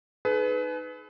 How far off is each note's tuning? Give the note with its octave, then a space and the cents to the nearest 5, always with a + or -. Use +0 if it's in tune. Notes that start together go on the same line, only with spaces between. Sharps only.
D#4 +0 G#4 +45 B4 +20